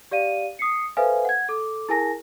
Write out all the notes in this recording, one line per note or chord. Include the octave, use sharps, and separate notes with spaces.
G4 D5 F5 D#7
D#6 C7 C#7
A4 B4 C5 E5 F5 G#5
F#5 G#6
A4 D6
E4 G#4 A#4 G#5 A5 A#6